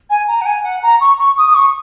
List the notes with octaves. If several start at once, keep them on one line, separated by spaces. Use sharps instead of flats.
G#5
A#5
F#5
G#5
F#5
A#5
C#6
C#6
D#6
D#6
C#6